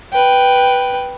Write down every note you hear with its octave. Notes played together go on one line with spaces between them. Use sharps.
B4 G5